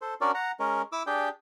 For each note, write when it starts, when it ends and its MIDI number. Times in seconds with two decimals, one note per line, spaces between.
0.02 0.14 69
0.02 0.14 72
0.21 0.31 61
0.21 0.31 62
0.21 0.31 66
0.21 0.31 70
0.21 0.31 74
0.35 0.52 78
0.35 0.52 82
0.60 0.82 56
0.60 0.82 61
0.60 0.82 70
0.92 1.03 64
0.92 1.03 86
0.92 1.03 88
1.07 1.29 62
1.07 1.29 67
1.07 1.29 68
1.07 1.29 79